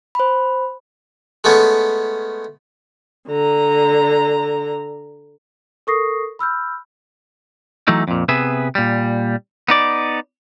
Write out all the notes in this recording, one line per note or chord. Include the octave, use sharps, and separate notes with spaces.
C5 B5
G#3 A3 B3 C#4
D3 A#5
A4 A#4 C#6 D#6 A#6 C7
B5 E6 F6 G6
E3 F#3 A3 D#4
F2 A#2
C3 B3 G#4 B4 E5
A#2 G3
B3 D#4 D5